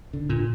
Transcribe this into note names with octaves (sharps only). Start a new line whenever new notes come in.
D3
A#2